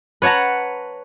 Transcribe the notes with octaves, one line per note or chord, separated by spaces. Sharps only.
B4 C#5 F#5 A5 A#5